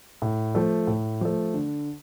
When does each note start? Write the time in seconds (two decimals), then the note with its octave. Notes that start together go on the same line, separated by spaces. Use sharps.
0.22 A2
0.55 F3 A3
0.87 A2
1.21 F3 A3
1.54 D3